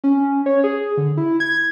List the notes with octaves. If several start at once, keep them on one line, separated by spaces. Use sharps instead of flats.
C#4
C#5
G#4
D3
E4
G#6